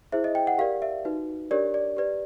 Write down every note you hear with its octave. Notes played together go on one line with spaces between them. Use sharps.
E4 G#4 C5 E5
D#5
G5
F#5
G4 A#4 D5 F5
E5
D#4 F#4 B4
D4 G4 A#4 C#5 D5
D5
G4 B4 D5